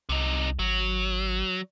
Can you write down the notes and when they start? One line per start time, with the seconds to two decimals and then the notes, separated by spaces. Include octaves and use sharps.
0.09 C2 C3 D#4
0.59 G#1 F#3